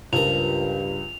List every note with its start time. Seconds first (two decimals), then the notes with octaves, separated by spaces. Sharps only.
0.13 C#2 G2 F3 A#4 F7